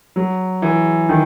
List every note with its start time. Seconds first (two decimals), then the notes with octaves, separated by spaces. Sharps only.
0.16 F#3
0.62 E3
1.09 D#3